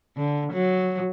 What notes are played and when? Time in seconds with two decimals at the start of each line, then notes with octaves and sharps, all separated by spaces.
0.17 D3
0.52 F#3